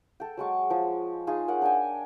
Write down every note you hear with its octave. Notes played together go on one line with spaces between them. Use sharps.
A4 G5
F#3 G#3 C#6 D6
F3
D#4 F4 G#4 C#6
A#4 C#5 F#5
D4 G5 G#5